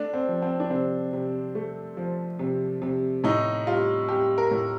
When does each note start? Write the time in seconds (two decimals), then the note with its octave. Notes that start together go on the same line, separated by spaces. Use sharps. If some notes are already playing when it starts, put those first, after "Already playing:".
Already playing: A3 D4
0.13 C4
0.28 F3
0.42 C4
0.60 D4
0.70 C3 C4
1.13 C3
1.55 A3
1.97 F3
2.39 C3
2.82 C3
3.24 A2 D#4
3.67 G3 F4
4.09 G3 G4
4.38 A#4
4.51 A2